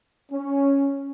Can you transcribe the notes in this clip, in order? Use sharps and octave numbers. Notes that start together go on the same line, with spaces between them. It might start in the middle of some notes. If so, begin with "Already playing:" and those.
C#4